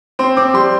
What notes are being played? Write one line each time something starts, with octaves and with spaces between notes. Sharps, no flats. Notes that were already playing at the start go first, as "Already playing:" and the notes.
C4 C6
C4 D6
G3 C6